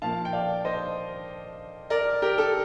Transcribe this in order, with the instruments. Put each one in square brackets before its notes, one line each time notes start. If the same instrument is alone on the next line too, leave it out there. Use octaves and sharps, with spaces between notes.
[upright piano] A#2 F3 A#3 F5 A5
G5
D5 F5
C5 D#5
A#4 D5
G4 A#4
A4